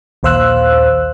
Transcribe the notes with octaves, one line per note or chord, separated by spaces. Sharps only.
A#1 D#2 C5 F5 E6 F#6